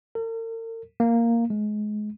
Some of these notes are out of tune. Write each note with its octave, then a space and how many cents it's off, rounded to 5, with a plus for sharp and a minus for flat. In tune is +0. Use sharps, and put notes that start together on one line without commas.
A#4 -45
A#3 -5
G#3 +25